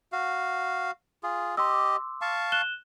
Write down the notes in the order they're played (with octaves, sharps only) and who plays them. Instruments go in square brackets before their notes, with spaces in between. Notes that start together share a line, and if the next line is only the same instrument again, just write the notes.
[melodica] F#4 F5
F4 G#4
[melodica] G4 D#5 [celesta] C6 D6 E6
[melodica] F5 A5 C#6
[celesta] F#6 E7 G7